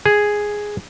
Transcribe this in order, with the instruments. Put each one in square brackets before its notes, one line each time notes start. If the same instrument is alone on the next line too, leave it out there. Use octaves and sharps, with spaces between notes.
[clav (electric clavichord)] G#4